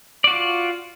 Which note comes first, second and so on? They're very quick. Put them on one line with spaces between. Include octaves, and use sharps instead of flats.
D5 F#4 F4